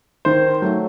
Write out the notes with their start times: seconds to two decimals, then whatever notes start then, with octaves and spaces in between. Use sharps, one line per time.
0.25 D#3 C5
0.62 F#3 A3